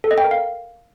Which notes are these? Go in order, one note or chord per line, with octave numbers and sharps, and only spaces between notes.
A4
D#5
G5
A#4
F5